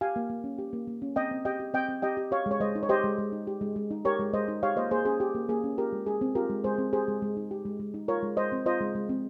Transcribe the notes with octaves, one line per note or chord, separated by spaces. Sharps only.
G4 F5 G#5
A#3
A#3
C#4
G4
A#3
A#3
C#4
C4 D#5 G5
C4
G4 D#5 G5
G4
C4 D#5 G5
C4
G4 D#5 G5
G4
G4 C#5 F5
G#3
C#5
G#3 C5 D#5
D#4
C#5
G4 C5 D#5
G#3
G#3
D#4
G4
G#3
G#3
D#4
G4 A#4 C#5
G#3
G#3 C5 D#5
D#4
G4 C#5 F5
A#3 C5 D#5
A#3 G#4 C5
C#4 G#4
G4
A#3
A#3 G#4
C#4
F4 G4 A#4
G#3
G#3 G#4
C4
F4 G4 A#4
G#3
G#3 G#4 C5
C4
G4 G#4 C5
G#3
G#3
D#4
G4
G#3
G#3
D#4
F4 A#4 C#5
G#3
G#3 C5 D#5
C4
F4 C5 D#5
G#3
G#3
C4